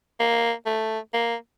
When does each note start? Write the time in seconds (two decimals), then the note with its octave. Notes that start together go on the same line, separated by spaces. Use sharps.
0.20 A#3
0.66 A3
1.13 A#3